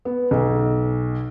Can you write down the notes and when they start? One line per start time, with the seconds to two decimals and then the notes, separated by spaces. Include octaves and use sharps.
0.05 B3
0.31 B1